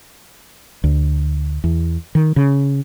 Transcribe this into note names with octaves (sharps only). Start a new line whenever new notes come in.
D2
E2
D#3
C#3